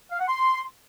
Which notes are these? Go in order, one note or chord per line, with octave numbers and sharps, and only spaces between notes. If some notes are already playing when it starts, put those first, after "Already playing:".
F5
F#5
C6